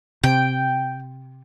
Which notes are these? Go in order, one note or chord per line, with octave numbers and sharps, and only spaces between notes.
C3 G5